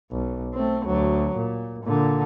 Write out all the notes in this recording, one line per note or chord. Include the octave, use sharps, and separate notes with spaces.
B1
A3 C4
D2 F#3
A#2
A#2 D3